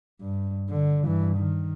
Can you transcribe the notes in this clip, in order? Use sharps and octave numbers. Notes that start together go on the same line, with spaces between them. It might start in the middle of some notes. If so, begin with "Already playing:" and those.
G2
D3
G2 E3
D#3